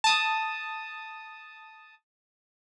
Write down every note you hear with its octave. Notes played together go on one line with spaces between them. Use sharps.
A5 D#6